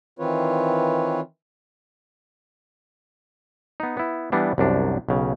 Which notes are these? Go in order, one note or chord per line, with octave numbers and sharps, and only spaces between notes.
D#3 E3 C4 F4 B4 C#5
B3 D#4
B3 E4
E3 G3 B3 D4
C2 F#2 D4
B1 C#3